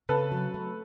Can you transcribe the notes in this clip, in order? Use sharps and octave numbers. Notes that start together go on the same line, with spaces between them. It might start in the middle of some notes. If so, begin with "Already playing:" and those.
C#3 A4 B4
F#3
A3